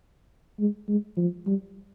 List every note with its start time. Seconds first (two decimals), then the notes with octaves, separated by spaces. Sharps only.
0.59 G#3
0.89 G#3
1.18 F3
1.47 G3